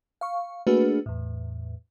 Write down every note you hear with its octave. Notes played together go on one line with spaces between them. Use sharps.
F5 C#6
A3 A#3 D4 F#4 G#4 B4
E2 A2